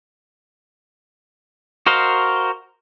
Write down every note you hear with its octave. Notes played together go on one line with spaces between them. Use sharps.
F#4 A#4 C5 D#5 F5